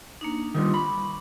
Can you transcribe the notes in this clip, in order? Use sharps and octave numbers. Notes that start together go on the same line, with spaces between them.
A#3 D4 D#4
D#3 G3 D4 F4 C6
B5 C#6 D6